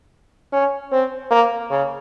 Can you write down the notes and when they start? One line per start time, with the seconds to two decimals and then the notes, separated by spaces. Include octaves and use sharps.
0.53 C#4
0.92 C4
1.31 A#3
1.70 C#3